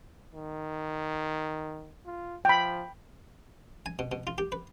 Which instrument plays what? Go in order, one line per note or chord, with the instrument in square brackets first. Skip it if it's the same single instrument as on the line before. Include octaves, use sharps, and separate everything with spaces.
[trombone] D#3
F4
[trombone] F3 [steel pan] G5 B5
[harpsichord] G#5
B2
B2
F4
G4
B4